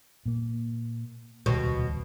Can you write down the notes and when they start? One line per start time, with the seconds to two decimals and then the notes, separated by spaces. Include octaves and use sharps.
0.26 A#2 A#3
1.46 D#1 C#2 B2